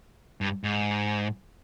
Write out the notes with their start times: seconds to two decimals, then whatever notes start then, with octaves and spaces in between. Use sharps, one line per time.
0.41 G2
0.64 G#2